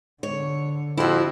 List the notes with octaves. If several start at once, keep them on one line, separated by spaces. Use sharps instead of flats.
D3 C#5
F2 E4 F#4